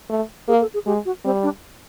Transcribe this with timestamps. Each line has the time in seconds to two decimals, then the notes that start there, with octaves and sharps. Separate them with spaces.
0.10 A3
0.48 A#3 G#4
0.61 A4
0.74 G#4
0.86 G#3 G4
1.05 F#4
1.24 G3 C4
1.43 D4